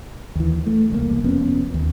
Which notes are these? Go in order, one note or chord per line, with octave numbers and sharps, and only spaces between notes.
D#2 E3
A3
E1 C2 C#3 A#3
F1 F2 B3 C#4
D#2